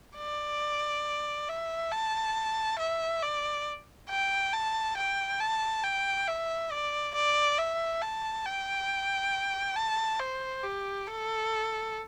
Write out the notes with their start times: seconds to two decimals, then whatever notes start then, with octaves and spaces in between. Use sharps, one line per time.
0.18 D5
1.48 E5
1.92 A5
2.79 E5
3.23 D5
4.10 G5
4.53 A5
4.97 G5
5.40 A5
5.84 G5
6.28 E5
6.72 D5
7.15 D5
7.58 E5
8.02 A5
8.46 G5
9.76 A5
10.20 C5
10.64 G4
11.07 A4